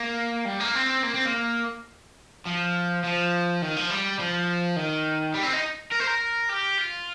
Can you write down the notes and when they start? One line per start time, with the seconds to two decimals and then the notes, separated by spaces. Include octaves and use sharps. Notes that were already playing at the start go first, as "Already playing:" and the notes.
Already playing: A#3
0.45 G3
0.60 A#3
0.75 C4
1.03 A#3
1.14 C4
1.25 A#3
2.47 F3
3.04 F3
3.62 D#3
3.77 F3
3.90 G3
4.19 F3
4.76 D#3
5.34 G3
5.43 C4
5.53 D#4
5.91 A#4
6.00 C5
6.07 A#4
6.49 G4
6.78 F4